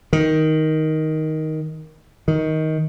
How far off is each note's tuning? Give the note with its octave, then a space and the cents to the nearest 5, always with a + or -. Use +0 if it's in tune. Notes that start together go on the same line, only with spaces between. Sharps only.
D#3 +10
D#3 +15